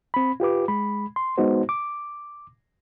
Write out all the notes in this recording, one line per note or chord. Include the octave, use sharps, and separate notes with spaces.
C4 B5
F4 G4 B4 D6
G#3 B5
C6
G#3 B3 D#4 F#4 C5
D6